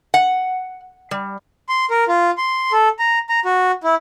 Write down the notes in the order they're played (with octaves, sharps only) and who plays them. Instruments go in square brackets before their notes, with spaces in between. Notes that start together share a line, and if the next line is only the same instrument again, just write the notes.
[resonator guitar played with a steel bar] F#5
G3
[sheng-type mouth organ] C6
A#4
F4
C6
A4
A#5
A#5
F#4
E4